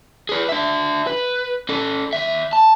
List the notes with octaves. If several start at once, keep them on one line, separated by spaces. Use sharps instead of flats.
G#4 B4
D4 E5
B4
C#4 A4
D#2 E5
A5